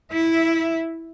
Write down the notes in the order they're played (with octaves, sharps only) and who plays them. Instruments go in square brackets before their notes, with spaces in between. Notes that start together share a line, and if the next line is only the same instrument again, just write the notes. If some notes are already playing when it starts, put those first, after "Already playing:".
[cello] E4 E5